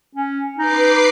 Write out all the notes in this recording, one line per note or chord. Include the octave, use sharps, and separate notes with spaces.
C#4
D#4 B4 D6 C7